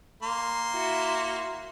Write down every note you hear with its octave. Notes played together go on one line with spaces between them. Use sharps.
A#3 C6
E4 F#4